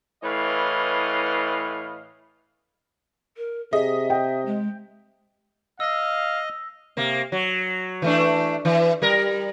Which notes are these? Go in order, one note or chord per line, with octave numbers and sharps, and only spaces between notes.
A2 E3 B4 C#5 D#5 F5
A#4
C3 G#4 D#5 E5
G5
G#3
D#5 F5 E6 A#6
C3 A#3
F#3
E3 A3 D4
E3
G3 A#4